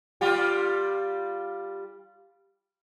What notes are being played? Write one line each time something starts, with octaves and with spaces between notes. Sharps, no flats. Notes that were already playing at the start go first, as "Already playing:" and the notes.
G3 F4 G4